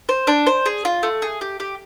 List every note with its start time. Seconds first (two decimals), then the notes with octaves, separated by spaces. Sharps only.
0.09 C5
0.27 D4
0.47 C5
0.66 G#4
0.85 F4
1.03 A3
1.22 G#4
1.41 G4
1.60 G4